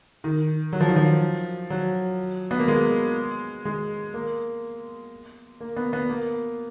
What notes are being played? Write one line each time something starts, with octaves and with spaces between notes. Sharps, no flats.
D#3
F#3
F3
D#3
F3
F#3
B3
A#3
G#3
G#3
A#3
A#3
B3
B3
A#3